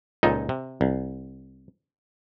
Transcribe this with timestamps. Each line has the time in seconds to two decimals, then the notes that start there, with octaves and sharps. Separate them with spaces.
0.23 C#2 A#2 D#4 A4 D#5 G#5
0.49 C3
0.81 C2